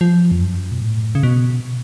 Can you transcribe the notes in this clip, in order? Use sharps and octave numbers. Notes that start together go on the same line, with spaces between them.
F3
F2
F#2
B2
A2
C#3
B2